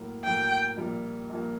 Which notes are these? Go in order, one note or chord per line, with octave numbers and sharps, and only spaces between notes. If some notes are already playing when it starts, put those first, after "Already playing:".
Already playing: A2 F#3 A#3
A2 F#3 A#3 G5
A#1 A#2 G3 A#3
A#1 A#2 G3 A#3